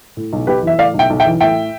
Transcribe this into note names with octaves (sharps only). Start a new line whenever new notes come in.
A2
B1
B1 G4 B4
E3 E5
A2 D5 F5
B1
E5 G5
B1
E5 G5
E3
A2 E5 G5